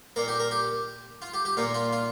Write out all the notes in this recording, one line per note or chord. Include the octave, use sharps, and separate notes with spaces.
A#2 A#3 A#4
G4
A#4
G4
F4
G4
G4
A#2 A#3 F4
F4
F4